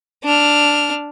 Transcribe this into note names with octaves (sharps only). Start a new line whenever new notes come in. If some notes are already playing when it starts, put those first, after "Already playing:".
D4 F6